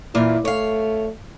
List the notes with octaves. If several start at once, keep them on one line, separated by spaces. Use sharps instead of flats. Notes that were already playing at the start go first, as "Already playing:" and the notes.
A#2 E3 E4 F4
A3 C#5 F5